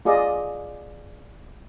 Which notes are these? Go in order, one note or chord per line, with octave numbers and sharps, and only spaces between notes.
F4 G#4 D5 D#5